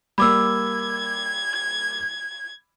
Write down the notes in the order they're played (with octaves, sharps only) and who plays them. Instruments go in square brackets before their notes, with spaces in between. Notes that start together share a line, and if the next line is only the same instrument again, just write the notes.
[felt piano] G3 A#3 [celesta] B5 D6 E6 [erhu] G#6